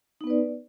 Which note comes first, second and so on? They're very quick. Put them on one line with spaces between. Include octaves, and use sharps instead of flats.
D#4 B3 B4 D5